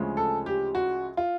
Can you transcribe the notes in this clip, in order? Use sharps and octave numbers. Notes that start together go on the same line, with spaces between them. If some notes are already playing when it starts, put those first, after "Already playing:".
Already playing: D2 C#3 F3 G#3 C#4
A4
G4
F#4
F4